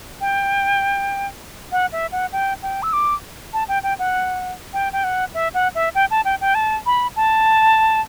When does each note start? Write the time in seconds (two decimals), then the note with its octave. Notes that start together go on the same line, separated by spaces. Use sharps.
0.21 G5
1.72 F#5
1.93 E5
2.12 F#5
2.33 G5
2.63 G5
2.83 E6
2.93 D6
3.53 A5
3.68 G5
3.83 G5
3.99 F#5
4.73 G5
4.93 G5
5.04 F#5
5.34 E5
5.54 F#5
5.75 E5
5.95 G5
6.11 A5
6.25 G5
6.41 G5
6.55 A5
6.86 B5
7.16 A5